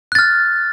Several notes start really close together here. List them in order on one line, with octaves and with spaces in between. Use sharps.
F#6 A6 F6